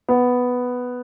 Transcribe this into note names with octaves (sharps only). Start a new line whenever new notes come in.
B3